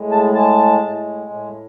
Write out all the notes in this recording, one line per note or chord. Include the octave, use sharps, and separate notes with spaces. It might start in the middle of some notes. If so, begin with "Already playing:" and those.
Already playing: A2 G#3
A5
G#3 A5
A2
A2